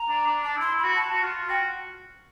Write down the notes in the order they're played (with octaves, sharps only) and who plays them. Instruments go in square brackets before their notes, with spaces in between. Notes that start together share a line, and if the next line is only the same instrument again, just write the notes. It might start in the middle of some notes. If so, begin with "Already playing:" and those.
Already playing: [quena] A#5
[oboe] D4
D4
[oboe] D4 [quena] A5
[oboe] E4 [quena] C6
[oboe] E4
[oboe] F#4 [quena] B5
[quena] A5
[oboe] F#4
F4
[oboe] F#4 [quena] G5